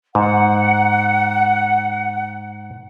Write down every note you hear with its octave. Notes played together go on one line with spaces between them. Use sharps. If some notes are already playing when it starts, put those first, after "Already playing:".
G#2 F#5